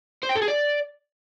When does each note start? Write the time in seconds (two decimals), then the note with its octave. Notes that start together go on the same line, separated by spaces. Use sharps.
0.23 C5
0.29 G5
0.35 A4
0.42 G#4
0.48 D5